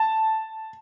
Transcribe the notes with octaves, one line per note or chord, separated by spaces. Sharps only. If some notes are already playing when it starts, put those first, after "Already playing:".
Already playing: A5